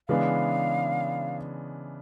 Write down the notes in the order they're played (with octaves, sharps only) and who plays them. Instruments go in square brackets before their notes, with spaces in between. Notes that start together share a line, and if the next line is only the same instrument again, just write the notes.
[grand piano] C#3 E3 G#3 B3 D4 [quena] F5